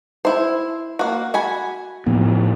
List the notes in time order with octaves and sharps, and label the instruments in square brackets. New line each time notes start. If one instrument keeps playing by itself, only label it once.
[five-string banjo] E4 C5
A#3 F#4
F#4 G#5 B5
[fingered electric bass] A2 F3 B3